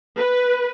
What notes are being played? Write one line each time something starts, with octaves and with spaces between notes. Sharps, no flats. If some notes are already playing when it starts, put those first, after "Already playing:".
B4